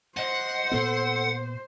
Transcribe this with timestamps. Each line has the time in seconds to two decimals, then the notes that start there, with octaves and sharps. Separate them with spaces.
0.17 C5 D#5 F#5
0.71 A#2 B3 A4